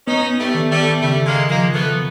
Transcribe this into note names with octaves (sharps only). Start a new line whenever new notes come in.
B3 C#4 D#4
G3 A3
D#3
G3 A3
C#3 G3 A3
G#3 A#3
F3 G#3 A#3
A3 B3